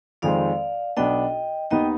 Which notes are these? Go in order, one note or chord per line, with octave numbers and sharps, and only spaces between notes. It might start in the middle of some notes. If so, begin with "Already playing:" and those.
F2 D#3 G#3 C4 D5 F5
B1 B2 B3 D4 D#5 G5
D#2 D#3 B3 D#4 D#5 G5